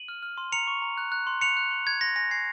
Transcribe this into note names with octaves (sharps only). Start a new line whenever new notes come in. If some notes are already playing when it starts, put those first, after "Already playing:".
Already playing: D#7 F#7
F6
F6
C6
A#5 C#7 F7
C#6
A#5
F#6
F#6
C6
F#6 C#7 F7
F#6
C6
F#6 G#6
C6 A#6
G#5 A#6
G#5 G#6 C7